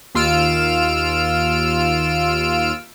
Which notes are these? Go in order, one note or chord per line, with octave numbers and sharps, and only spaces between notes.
D#2 F4 E6 F6 D7